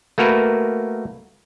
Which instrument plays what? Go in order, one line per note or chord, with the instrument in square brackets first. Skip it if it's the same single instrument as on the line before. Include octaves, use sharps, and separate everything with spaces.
[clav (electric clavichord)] A3 A#3 F#4 A#4 B4